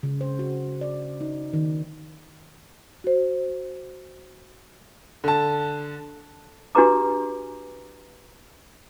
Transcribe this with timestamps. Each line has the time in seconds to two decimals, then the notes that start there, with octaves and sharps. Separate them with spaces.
0.03 C#3
0.21 C5
0.39 F#4
0.81 D5
1.21 D#4
1.53 D#3
3.04 F#4 C5
5.24 D3 A5
6.75 D4 F#4 G4 B4 A#5 D6